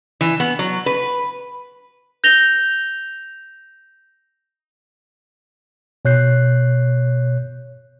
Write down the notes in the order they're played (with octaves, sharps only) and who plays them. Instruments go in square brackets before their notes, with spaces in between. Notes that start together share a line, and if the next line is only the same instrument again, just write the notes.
[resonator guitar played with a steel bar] E3
B3
F#3
B4
[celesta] G6 A#6 F7 G7
[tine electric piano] B2 C#5 F#6 G6 C7